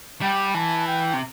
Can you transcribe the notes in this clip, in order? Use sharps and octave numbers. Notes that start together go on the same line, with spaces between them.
G3 G5
E3 A5
G5
C3